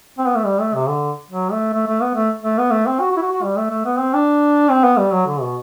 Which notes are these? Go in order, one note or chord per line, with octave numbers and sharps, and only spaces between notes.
C4
B3
A3
G3
A3
C3
D3
F#3
A3
A3
A3
B3
A3
A3
B3
A3
C4
F#4
F#4
E4
F#4
F#4
G3
A3
A3
B3
C4
D4
C4
B3
G3
F#3
D3
B2